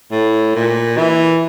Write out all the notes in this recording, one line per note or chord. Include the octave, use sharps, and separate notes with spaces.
A2
A#2
E3